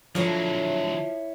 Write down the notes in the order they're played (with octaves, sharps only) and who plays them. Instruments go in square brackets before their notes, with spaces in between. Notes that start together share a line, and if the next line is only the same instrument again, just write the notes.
[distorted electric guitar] D3 F#3 [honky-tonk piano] F3 [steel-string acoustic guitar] E4 C#5 E5